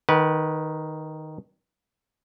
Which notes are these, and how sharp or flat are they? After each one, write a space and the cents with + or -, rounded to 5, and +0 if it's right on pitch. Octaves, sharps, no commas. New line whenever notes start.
D#3 +0 B4 -15 F#5 +30